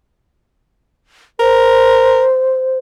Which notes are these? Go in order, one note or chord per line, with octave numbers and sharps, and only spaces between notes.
A#4 C5